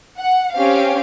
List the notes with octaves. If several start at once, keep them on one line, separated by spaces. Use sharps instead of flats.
F#5
C4 C#4 G4 F5